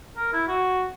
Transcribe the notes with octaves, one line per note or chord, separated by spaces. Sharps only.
A#4
E4
F#4